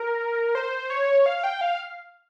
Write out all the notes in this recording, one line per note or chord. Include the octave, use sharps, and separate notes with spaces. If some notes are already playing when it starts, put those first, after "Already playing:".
Already playing: A#4
C5
C#5
F5
G5
F5